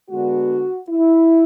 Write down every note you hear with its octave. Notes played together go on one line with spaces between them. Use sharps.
D3 G#3 B3 D4 F#4
E4